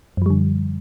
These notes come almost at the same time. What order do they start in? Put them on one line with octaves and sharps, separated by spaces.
F#2 F3 G3 D3